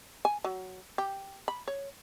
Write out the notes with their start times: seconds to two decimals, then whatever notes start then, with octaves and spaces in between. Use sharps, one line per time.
0.25 G#5
0.44 F#3
0.98 G4
1.48 B5
1.68 C#5